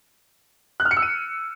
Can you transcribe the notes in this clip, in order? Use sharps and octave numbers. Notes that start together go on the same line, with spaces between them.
F#6
F6
C#7
E6
D#7